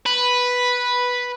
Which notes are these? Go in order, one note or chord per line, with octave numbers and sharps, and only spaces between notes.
B4